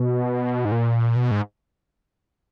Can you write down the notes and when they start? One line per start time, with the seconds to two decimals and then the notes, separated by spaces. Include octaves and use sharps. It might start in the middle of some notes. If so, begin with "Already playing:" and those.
Already playing: B2
0.65 G#2
0.72 A#2
1.16 B2
1.31 G#2